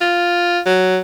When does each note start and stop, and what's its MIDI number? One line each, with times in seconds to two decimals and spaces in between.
0.01 0.60 65
0.66 1.00 54